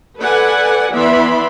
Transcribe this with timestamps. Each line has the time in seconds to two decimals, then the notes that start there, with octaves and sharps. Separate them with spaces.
0.19 A4 B4 D5 F#5 G#5
0.92 E3 B3 D5 E5 B5 C6